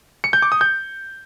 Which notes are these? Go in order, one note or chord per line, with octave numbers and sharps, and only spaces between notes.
C#7
G6
D6
D#6
G6